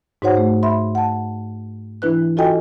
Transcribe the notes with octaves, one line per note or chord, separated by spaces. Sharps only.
G#2 D#4 F#4 C5 C#5 F#5
A3
E5 B5 C6
F#5 A5
E3 D4 E4 B4 F#6
F4 F#4 A4 D#5 G5 G#5